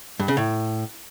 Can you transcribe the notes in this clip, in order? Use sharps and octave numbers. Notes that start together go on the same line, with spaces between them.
G2
C#3
A2